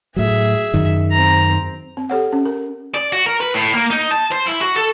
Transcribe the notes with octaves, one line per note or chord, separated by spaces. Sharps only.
A2 F#3 G#4 E5
F#2 D#3
C4 A#5
C4
G4 A4 C#5 F#5
C#4
A#4
D5
F#4
A#4
B4
A2
A#3
D#4
A5
C5
E4
F#4
A4